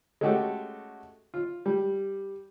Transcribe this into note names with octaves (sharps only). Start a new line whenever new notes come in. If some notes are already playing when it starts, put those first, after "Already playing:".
G#3 A3 C#4 F#4 G4 A4
F4
G3